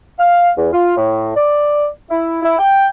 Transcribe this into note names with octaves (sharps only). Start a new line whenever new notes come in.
F5
E2
F4
A2
D5
E4
E4
G5